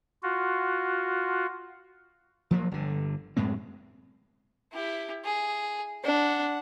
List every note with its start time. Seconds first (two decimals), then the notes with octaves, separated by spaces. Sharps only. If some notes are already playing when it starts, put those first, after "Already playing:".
0.22 F4 F#4
2.51 F3 F#3 A#3
2.71 G1 D3
3.37 F#2 A2 G#3 C4
4.72 E4 G4
5.24 G#4
6.04 D4 F#5